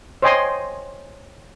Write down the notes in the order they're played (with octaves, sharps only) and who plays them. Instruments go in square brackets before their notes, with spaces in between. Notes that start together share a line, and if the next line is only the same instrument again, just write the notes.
[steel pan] C5 C#5 D#5 G5 G#5 C6